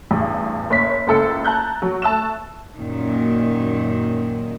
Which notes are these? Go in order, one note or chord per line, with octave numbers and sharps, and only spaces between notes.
A1 E2 G2
F#1 C#5 B6
F#1 C#2 A4 E6 C#7
A5 A#5 F#6 G6
F#3
A3 A5 E6 F#6 E7
F#2 A#2 D#3